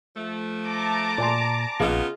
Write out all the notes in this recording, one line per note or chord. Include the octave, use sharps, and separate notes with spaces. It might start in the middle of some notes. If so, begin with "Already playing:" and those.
F3 A3
A5 A#5 D6
A#2 D5 G#5 C6
A#1 C#3 B3 F4 G#4 D#5 F5